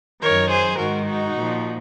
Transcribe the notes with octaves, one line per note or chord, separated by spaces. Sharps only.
F#2 D#3 A#4 C#5
G#4 C5
G#2 D#3 F#4 A#4
D#4 F#4
A#2 F3